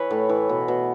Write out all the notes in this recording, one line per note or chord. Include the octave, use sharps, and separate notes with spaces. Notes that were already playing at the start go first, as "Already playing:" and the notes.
Already playing: E3 B4 C#5
A2
E3
B2
B2